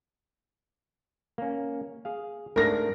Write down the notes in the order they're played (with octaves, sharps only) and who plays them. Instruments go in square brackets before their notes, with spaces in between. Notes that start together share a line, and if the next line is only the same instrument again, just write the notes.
[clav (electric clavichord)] A#3 C#4
G#4 F5
[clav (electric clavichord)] G#2 A3 D4 [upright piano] A#4 A#6